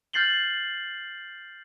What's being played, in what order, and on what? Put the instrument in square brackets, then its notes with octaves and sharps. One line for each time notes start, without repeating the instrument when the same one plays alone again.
[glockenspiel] F6 G6 A6 C7 F#7 G7